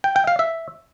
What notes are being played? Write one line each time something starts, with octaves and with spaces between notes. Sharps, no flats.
G5
G5
F5
E5